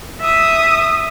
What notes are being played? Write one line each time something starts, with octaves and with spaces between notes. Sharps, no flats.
E5 D#6